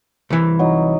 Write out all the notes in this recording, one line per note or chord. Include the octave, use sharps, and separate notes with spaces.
C2 E3
F#3 D#4